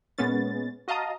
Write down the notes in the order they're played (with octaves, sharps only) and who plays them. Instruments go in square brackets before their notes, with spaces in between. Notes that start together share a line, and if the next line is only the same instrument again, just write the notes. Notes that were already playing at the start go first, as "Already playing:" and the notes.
[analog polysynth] A#2 G#3 B3 C#4 A6
F#4 D#5 F5 A5 A#5 D#6